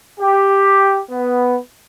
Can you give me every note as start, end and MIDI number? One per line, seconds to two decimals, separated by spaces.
0.20 1.00 67
1.11 1.56 59